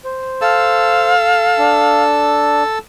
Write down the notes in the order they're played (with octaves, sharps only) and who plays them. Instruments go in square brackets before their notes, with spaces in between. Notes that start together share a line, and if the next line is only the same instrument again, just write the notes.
[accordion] C5
[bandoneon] A4 A5 E6 [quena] F5
[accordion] D4